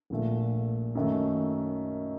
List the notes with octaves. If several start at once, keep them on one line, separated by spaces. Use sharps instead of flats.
A#1 A#2 A3
F#2 D#3 A3